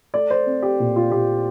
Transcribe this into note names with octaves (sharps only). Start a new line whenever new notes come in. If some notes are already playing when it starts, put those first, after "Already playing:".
A3 D5
C5
C4
G4
A#2
F4
A#2 G4